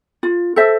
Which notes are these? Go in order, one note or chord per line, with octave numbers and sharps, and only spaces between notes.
F4
A4 C5 E5